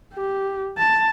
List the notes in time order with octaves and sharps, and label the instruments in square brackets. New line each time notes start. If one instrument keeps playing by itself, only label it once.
[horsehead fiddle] G4
A5